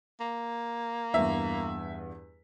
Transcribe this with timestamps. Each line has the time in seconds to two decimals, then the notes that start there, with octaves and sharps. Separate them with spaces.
0.21 A#3
1.14 E2 G2 E5